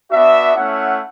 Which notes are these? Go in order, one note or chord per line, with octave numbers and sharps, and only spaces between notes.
B3 D4 F#4 E5
A3 C#4 E4 F#5